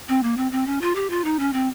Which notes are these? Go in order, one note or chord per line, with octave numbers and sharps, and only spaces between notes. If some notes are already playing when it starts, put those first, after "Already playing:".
C4
A#3
C4
C4
C#4
F4
G4
F4
D#4
C#4
C4